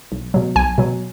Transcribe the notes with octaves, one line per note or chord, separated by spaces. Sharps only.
B1
B2 F#3
B1 G#5
B2 F#3